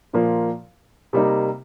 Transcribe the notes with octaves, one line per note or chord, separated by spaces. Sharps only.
A#2 F3 A#3
C3 G3 A#3 D#4